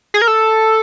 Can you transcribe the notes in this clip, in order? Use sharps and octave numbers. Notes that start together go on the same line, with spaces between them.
G#4
A#4
A4